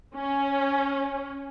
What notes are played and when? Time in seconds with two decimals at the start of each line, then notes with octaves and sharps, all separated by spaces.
0.15 C#4